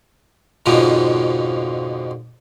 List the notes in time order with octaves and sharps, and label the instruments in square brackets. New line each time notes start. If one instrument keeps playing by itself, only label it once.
[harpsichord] F2 G#2 B2 D3 F3 C#4